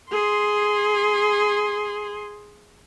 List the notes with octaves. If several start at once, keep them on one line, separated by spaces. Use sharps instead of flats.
G#4 C6